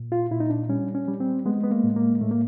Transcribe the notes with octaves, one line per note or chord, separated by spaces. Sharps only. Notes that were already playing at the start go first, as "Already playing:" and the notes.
Already playing: A#2
F4
A#2 E4
D#4
D4
G3 C#4
C#4
G3
C4
G#3 B3
B3
A#3
A2
A#3
A2 A3
A#3